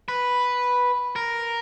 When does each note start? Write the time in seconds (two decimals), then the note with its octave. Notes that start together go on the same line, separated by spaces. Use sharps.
0.08 B4
1.16 A#4